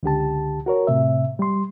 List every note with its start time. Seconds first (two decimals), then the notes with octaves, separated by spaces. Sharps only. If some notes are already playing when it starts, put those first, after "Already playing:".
0.03 C#2 D3 G4 A5
0.66 F#4 A#4 C#5
0.87 A2 C3 E5
1.39 G3 C6